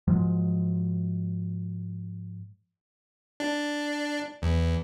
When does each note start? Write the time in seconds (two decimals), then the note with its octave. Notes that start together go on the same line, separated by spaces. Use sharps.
0.07 G#2 F3 F#3 G#3
3.40 D4
4.42 E2